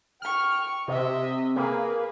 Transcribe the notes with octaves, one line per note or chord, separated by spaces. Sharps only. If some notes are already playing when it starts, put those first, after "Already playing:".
G5 C#6 F6
C3 D#5 E5
A#3 G#4 B4